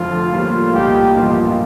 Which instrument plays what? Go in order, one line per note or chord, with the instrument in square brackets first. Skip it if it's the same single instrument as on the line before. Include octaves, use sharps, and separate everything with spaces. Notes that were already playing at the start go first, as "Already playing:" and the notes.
Already playing: [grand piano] F1 F2 D3 [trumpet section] F4
[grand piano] A2 G3 A#3 [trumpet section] F4
[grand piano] C2 A#2 G3 [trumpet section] D#4 G4
[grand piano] A1 G2 F3 A#3 D#4 [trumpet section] F4